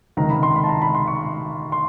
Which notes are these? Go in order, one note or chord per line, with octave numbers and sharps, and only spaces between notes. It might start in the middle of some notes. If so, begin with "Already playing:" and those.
C#2 C3 D#3 A#5
B5
C6
B5
A5
A#5
B5
C6
C#6
C6